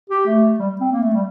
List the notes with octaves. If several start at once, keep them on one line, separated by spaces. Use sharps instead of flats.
G4
A3
G3
C4
A#3
A3
G3